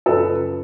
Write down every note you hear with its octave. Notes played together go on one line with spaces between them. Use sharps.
F#2 C#3 F3 A4 B4